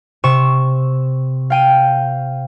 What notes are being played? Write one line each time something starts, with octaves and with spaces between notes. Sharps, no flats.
C3 C#6 E7
F5 G5 D#7